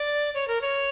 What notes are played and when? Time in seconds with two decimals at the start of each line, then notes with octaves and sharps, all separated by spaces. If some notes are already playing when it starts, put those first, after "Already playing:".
Already playing: D5
0.34 C#5
0.48 A#4
0.61 C#5